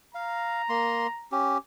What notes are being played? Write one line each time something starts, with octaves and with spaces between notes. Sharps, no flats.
F5 A#5
A#3 C6
C#4 G4